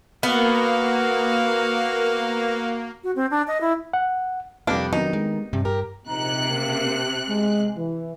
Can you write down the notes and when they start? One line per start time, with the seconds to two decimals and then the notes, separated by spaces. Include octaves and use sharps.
0.23 A#3 B3 F#4 F5
3.04 F#4
3.16 C4
3.31 D4
3.48 D#5
3.61 E4
3.93 F#5
4.67 F2 C3 G3 A#3 B3 D4 G4
4.93 D#3 F#3 B3 C4 D4 D#4
5.13 G#3
5.53 G2 C3
5.65 G4 A#4
6.08 A#1 C3 D#4 A#5 F#6
6.49 C#3 A#3
7.28 G#3
7.77 E3